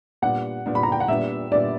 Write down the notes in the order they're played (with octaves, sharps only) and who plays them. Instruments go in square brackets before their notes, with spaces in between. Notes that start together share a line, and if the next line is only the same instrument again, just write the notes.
[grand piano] A#2 G3 B3 D4 [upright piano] F#5
[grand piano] A#2 G3 B3 D4
[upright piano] B5
A#5
G5
F#5
[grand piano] A#2 G3 B3 D4 [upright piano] E5
[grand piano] A#2 G3 B3 D4 [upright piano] D5